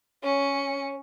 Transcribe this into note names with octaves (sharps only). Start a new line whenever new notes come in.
C#4 C#5 C#7